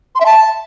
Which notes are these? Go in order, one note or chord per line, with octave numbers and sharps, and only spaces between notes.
C6
E5
A5